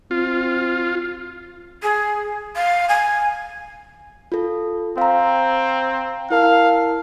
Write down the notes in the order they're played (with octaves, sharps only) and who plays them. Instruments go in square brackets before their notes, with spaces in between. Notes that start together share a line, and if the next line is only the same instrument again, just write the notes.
[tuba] C4 [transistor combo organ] F4
[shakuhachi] G#4
F5
G#5
[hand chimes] F4 A4
[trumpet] C4 [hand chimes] F5 A#5
[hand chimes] E4 A#4 A5 [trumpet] F5